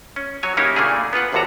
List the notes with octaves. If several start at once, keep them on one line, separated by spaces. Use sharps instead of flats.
C#4
F#3 C#5 G#5
C#3 A#3 C#4 D#4 E4 G4
A#2 C#3 A3 A#3 D4 G#4
B3 F4 B4 F#5
G#1 D#2 A2 C3 F#4 A#5